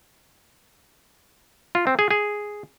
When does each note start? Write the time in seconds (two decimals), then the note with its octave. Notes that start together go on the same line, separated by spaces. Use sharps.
1.75 F4
1.87 C4
1.99 G#4
2.11 G#4